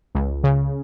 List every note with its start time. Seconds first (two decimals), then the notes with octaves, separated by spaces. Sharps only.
0.15 C#2
0.44 C#3